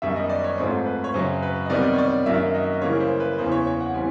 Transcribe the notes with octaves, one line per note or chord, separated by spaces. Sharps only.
F#2 D#3 G3 B3 E5
D#5
D5
C#5
G#2 F3 A3 C4
B4
C#5
F#2 C#3 F#3 C5
B4
D#5
C3 D#3 G3 B3 D5
C#5
D5
F#2 D#3 F#3 A#3 E5
D#5
C#3 E3 G3 A#3 C#5
C5
B4
E2 C#3 E3 C5
C#5
C#5
F#5
E3 G3 C4 G#5